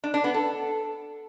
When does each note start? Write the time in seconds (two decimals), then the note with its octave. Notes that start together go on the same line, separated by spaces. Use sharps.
0.04 D4
0.14 D4
0.24 B3
0.34 A4